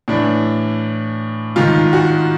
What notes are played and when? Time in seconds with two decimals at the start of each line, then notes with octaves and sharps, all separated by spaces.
0.08 A2 E3 D4
1.56 G#2 D#3 F4
1.93 F#4